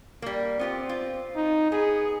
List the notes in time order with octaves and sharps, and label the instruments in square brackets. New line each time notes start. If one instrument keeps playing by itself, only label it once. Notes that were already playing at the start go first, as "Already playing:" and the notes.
[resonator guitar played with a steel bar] G3 A#3
[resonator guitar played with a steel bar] B3 F4 G4 [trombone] C4
[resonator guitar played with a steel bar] F4
[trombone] D#4
[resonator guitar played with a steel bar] B3 [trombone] G#4